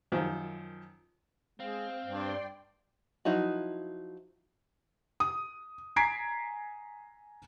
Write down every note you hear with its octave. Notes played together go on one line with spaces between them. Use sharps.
F#2 D#3 F3
G#3 C4 F5
G2 D5 G5 C6
F3 F#3 D#4 E4 F#4
D#6
G#5 A#5 G#6 B6 C7 D7